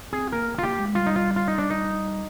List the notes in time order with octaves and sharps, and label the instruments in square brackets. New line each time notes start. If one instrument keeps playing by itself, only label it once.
[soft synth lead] C4 [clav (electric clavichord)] G#4
[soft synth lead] A#3 [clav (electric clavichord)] A#4
[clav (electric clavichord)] F4
[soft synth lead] A#3 [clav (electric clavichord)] G4
[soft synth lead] G#3
[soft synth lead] G3 [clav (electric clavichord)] F4
[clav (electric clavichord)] D#4
F4
F4
D#4
D4
D#4